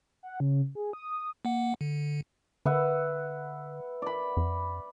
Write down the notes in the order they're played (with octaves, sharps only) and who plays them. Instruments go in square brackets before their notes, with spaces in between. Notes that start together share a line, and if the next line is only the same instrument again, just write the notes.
[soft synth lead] F#5
C#3
G#4
D#6
[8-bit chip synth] A#3 F#5
D3
[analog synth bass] D3 [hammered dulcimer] B4 E5 F#5
[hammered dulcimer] D5 B5
[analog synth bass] F2